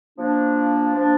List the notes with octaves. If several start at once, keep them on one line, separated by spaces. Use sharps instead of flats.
F3 A#3 D4
F3 A#3 D4